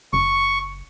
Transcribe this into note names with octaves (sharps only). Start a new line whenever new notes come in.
F#1 C#6